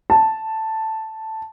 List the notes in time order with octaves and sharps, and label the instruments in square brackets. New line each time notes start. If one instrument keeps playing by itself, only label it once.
[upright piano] A5